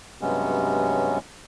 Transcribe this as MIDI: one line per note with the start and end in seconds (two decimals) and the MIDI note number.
0.22 1.18 43
0.22 1.18 48
0.22 1.18 54
0.22 1.18 56
0.22 1.18 59
0.22 1.18 61